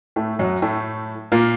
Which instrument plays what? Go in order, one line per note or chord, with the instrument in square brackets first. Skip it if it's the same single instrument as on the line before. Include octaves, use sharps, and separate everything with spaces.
[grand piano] A2 A3
F#2 F#3
A2 A3
A#2 A#3